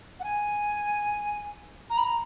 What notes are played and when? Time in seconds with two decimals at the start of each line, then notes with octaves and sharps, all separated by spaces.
0.20 F#5
0.24 G#5
1.90 A#5
1.98 B5
2.05 A#5